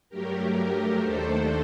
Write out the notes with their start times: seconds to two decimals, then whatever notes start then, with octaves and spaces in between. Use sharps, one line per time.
0.10 G2 F#3 A3 G4 A#4
0.54 G4 A#4
1.00 D#2 D#3 A3 D4 A4 C5